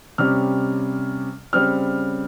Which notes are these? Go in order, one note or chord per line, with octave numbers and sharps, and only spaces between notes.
C3 G3 C#4 F6
C#3 G3 C4 F6